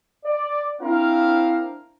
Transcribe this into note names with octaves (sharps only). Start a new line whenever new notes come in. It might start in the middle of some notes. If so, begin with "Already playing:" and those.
D5
C4 D4 E4 A#4 C5 F5